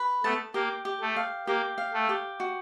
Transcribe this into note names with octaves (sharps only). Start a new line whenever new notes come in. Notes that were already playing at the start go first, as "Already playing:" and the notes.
Already playing: B4
A3 B3 A5
A#3 G4
G4
A3
F5
A#3 G4
F5
A3
G4
F#4